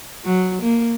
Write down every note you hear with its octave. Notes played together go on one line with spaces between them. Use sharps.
F#3
A#3